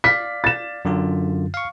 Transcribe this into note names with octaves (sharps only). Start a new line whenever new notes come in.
D5 F5 B6
A6 E7
F#2 D3 F4
F5 C#6